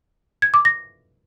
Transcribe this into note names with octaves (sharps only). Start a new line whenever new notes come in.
G#6
D6
A#6